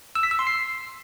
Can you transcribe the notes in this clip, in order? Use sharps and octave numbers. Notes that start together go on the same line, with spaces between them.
E6
B6
E6
C6
C7